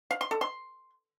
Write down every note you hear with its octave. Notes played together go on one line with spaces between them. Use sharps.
F5
C6
A4
C6